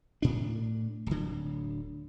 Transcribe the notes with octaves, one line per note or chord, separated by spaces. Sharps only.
A2 D4
D1 D3